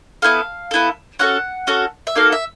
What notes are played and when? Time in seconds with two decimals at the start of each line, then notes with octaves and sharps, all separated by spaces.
0.22 B3 E4 A4 F5
0.71 B3 E4 A4
1.19 C#4 F#4 A4 F#5
1.67 C#4 F#4 A4
2.07 E5
2.16 A#3 D#4 F#4 A4 F5
2.32 E5